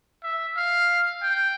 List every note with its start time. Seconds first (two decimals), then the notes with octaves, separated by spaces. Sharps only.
0.23 E5
0.57 F5
1.23 G5